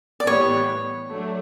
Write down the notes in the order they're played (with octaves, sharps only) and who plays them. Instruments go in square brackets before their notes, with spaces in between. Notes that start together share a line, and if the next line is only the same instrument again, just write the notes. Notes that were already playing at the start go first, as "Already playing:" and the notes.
[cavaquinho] D5
[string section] A2 E3 G3 B3 [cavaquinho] C#5
[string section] F#3 A3 D4